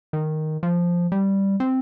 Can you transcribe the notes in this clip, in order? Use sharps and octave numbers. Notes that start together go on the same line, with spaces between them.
D#3
F3
G3
C4